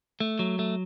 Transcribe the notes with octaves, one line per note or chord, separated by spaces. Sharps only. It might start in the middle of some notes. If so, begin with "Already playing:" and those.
A3
F#3
A3